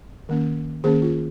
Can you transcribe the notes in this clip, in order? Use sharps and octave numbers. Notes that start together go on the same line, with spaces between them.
D#3 A#3 C#4
D#3 A#3 C#4 G#4 C5
F4